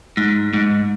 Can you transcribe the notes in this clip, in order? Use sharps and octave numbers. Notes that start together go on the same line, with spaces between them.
G#2
G#2